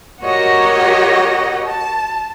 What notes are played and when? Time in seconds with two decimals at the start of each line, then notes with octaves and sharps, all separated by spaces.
0.23 F#4 G4 A#4 C#5 D#5 F#5
1.66 A5